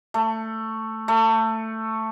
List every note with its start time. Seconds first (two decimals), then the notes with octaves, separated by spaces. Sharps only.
0.14 A3
1.08 A3